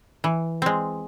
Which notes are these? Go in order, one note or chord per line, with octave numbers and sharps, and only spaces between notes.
E3
G#3 C4